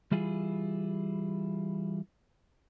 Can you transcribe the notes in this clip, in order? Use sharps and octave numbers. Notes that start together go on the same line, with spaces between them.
E3 G3 E4 F4 G#4